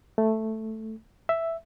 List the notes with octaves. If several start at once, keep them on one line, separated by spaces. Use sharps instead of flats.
A3
E5